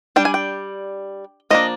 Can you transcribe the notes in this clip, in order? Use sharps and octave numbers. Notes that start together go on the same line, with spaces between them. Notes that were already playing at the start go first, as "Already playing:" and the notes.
G3 D4 G5
G#5
G5
F3 A#3 D4 D#5